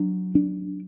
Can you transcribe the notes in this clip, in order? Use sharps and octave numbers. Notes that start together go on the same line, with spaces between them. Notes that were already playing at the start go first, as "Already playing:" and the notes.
Already playing: F#3 D4
D4